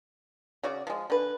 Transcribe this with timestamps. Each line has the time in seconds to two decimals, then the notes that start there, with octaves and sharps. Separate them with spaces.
0.63 C#3 F#4 D5
0.87 F3 G#3
1.10 D3 B4